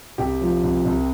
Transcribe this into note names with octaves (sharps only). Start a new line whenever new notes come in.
C2 G4
F3
C2
C2